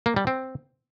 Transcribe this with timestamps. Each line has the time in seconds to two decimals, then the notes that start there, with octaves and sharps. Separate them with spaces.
0.06 A#3
0.16 G3
0.27 C4